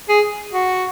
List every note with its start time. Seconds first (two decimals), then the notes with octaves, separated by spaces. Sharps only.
0.09 G#4
0.52 F#4